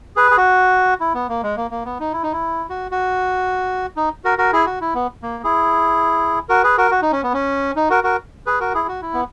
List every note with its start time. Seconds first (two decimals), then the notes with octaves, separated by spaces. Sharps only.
0.16 G#4 B4
0.31 G#4
0.37 F#4
1.00 E4
1.14 B3
1.29 A#3
1.43 G#3
1.57 A#3
1.71 A#3
1.85 B3
2.00 D#4
2.13 E4
2.23 D#4
2.33 E4
2.70 F#4
2.91 F#4
3.97 D#4
4.24 F#4 A#4
4.38 F#4 A#4
4.53 E4 G#4
4.66 F#4
4.81 E4
4.94 B3
5.23 A#3
5.44 E4 G#4
6.49 F#4 A#4
6.63 G#4 B4
6.78 F#4 A#4
6.91 F#4
7.02 D#4
7.12 C#4
7.23 B3
7.33 C#4
7.76 D#4
7.90 F#4 A#4
8.04 F#4 A#4
8.46 G#4 B4
8.60 F#4 A#4
8.74 E4 G#4
8.88 F#4
9.02 E4
9.14 B3